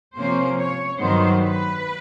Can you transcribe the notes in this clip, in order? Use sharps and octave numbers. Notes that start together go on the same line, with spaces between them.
C3 F3 A#3 C#4 C5
C#5
G2 D#3 F#3 B3 C5
B4